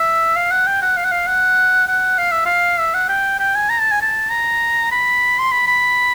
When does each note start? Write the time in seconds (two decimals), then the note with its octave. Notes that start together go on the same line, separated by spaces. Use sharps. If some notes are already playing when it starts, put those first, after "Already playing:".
Already playing: E5
0.36 F5
0.51 F#5
0.67 G5
0.82 F#5
0.97 F5
1.04 F#5
1.11 F5
1.27 F#5
1.87 F#5
2.18 F5
2.31 E5
2.46 F5
2.79 E5
2.94 F#5
3.09 G5
3.39 G5
3.55 G#5
3.70 A#5
3.80 A5
3.91 G#5
4.02 A5
4.30 A#5
4.92 B5
5.39 C6
5.52 B5
5.67 B5